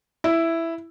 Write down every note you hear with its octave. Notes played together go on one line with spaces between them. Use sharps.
E4